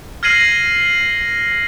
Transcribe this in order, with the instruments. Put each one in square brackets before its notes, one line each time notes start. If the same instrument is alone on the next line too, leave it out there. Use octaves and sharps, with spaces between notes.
[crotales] F6 G#6 A#6 C7 D#7 F#7